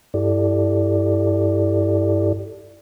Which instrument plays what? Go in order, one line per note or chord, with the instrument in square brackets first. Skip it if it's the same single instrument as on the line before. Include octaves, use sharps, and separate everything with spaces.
[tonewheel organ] G2 E4 G4 A4 D5